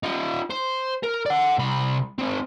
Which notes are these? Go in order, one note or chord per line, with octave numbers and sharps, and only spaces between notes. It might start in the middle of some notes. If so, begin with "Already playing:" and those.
D#4 F4
C5
A#4
D5 F#5
C2 B5
C4 D#4